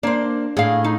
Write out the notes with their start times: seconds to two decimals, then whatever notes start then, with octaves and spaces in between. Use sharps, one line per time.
0.03 A#3 D4 C5
0.57 A2 G#4 F5
0.84 D#4